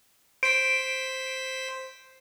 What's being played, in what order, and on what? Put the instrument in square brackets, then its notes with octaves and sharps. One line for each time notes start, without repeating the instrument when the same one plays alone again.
[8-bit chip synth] C5 B6 [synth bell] D7